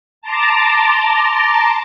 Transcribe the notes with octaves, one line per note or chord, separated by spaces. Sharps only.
A5 A#5 C6 D6